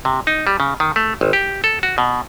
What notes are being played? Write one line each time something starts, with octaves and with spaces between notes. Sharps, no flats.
C3
D#4
G3
C#3
D#3
A3
G#1
G4
A4
F#4
B2